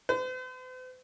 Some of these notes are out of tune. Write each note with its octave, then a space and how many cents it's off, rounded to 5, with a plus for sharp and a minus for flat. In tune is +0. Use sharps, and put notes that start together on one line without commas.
C5 -45